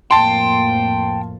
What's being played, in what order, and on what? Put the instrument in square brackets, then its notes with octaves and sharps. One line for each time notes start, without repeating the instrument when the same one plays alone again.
[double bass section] F2 A2 A#3 [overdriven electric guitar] G5 [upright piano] A5 C6